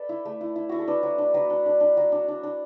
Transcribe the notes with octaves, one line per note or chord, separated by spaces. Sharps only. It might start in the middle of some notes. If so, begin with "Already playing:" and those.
Already playing: A4 B4 D5
E4
A3
E4
E4
E4 F#4
A4
D4 B4
F#3
D4
F#3 B4
D4
D4
D4
F#3
D4
D4
D4